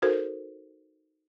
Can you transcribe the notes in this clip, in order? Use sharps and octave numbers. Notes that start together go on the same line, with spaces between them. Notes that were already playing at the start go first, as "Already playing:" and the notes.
D#4 F#4 A4 A#4 C5